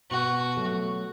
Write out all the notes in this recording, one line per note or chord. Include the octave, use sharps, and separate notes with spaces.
B2 F#4
F#3 A3